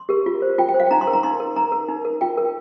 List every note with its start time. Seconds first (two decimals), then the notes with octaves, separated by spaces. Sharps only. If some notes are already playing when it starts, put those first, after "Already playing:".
Already playing: C6
0.09 G4 A#4
0.26 F4
0.42 C5
0.58 F4 G5
0.69 G5
0.74 C5
0.80 F5
0.87 G5
0.91 D#4 A#5
1.01 C6
1.07 A#4
1.13 A#5
1.23 D#4 C6
1.40 A#4
1.56 D#4 A#5
1.72 A#4
1.88 D#4
2.05 A#4
2.21 F4 G5
2.37 A#4